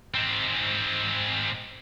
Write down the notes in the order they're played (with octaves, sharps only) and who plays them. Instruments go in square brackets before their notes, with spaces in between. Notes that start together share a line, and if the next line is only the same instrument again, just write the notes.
[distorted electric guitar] G#2 C4